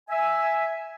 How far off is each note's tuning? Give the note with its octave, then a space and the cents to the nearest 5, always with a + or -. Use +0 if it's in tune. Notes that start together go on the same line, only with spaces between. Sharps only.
E5 +0 G#5 +0